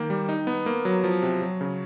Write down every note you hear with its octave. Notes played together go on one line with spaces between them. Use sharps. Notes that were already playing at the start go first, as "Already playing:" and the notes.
Already playing: D#3 A#3
G3
D#4
B3
A#3
F#3
F3
C3
F#3
C#3